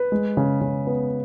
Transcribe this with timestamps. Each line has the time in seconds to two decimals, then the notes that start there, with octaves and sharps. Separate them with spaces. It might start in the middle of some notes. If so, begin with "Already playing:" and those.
Already playing: B4
0.12 G#3
0.37 C#3
0.61 C#3
0.87 B3